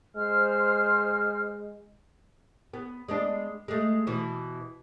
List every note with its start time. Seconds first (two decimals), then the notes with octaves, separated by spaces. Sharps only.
0.16 G#3 C5 F6
2.74 B3
3.08 G#3 B3 D4
3.68 G#3 A3
4.07 B2 E3